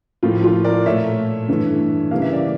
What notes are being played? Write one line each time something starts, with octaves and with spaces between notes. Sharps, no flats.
A2 F3 A#3 F4
F4
A#4 D5
A#2 A3 C#5 E5
G2 E3 A3
C#3 E3 G3 A#3 F5
E5
D5